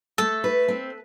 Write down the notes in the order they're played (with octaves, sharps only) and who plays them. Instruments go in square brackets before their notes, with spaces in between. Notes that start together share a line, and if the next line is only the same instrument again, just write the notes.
[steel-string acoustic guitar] A3 [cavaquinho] A4
[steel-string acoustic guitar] B4
C4